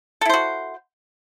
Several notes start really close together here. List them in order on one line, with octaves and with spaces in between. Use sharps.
A4 E4 C5 F#4